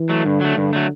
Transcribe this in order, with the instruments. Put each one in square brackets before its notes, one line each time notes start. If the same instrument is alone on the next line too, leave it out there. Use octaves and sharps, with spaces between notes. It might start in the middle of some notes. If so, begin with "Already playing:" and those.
Already playing: [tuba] E3
[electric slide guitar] F#3 A3
[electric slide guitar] G2 [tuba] D3
[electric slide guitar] F#3 A3
[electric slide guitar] G2 [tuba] D3
[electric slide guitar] F#3 A3